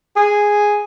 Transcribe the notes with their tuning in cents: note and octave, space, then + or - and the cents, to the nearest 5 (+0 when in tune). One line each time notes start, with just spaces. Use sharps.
G#4 -5